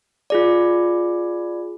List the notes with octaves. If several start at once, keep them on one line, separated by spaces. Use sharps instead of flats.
F4 G#4 D5